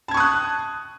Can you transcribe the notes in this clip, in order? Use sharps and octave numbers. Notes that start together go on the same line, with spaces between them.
A5 C#6 D#6 F#6 G#6